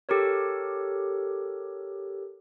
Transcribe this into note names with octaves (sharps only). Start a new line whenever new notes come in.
G4 A4 A#4 C#5